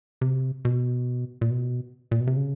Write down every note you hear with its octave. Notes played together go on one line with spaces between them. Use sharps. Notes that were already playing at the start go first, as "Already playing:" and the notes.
C3
B2
A#2
B2
A#2
B2
C3
C#3